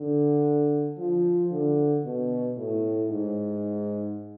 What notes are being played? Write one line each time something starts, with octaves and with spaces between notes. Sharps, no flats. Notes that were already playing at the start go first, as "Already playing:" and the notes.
Already playing: D3
F3
D3
B2
A2
G#2